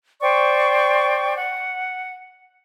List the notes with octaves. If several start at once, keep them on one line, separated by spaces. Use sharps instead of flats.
C5 D5 G5 C#6
F#5